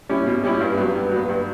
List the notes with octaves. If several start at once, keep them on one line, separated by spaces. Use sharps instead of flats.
G3 C#4 E4
B2
G3 C#4 E4
G2
F#3 B3
G2
F#3 B3
G2